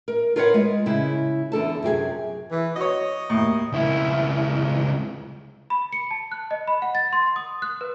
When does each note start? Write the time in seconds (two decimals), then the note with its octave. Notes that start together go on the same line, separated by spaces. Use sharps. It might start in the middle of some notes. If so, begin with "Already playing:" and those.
0.08 A#4
0.36 F4 A#4 B4 C#5 E5 F#5
0.54 G#3
0.86 C#3 E4
1.52 E2 D3 A4 A5
1.83 F#2 C3 G4 G#4
2.51 E3
2.76 F#4 C#5 D#5
3.30 D#2 A2
3.72 C#2 E4
5.70 B5
5.92 C#7
6.11 A5
6.32 F#6
6.51 D#5
6.68 B5
6.82 F#5
6.95 A6
7.13 C6
7.36 D#6
7.62 F#6
7.81 B4